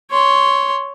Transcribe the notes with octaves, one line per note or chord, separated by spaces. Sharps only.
C#5 C6